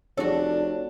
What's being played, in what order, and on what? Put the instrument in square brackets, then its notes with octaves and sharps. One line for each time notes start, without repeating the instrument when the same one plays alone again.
[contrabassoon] F1 [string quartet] D4 [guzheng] F#4 A4 [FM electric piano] C#5 D5